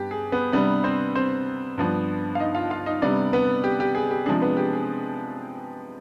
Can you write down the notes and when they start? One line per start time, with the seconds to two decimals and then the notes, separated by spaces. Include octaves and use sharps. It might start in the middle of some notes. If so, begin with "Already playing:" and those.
Already playing: G2 B3 G4
0.11 G#4
0.32 B3 B4
0.52 C3 G3 B3 D4 B4
0.84 C4 C5
1.15 C4 C5
1.78 G2 F3 B3 D4
2.35 F5
2.39 D#4 D#5
2.55 F4 F5
2.70 F4 F5
2.86 D#4 D#5
3.02 C3 G3 B3 D4 D5
3.33 B3 B4
3.64 G4
3.80 G4
3.95 G#4
4.11 G4
4.26 C3 F3 G#3 D4 G#4
4.42 B3 B4
4.57 G4
4.73 G#4